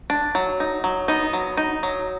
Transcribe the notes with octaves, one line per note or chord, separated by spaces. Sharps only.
D4
F#3
D#4
F#3
B3 D#4
F#3
D#4
F#3